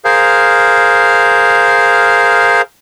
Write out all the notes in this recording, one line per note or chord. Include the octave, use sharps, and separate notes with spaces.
G#4 A#4 C5 F5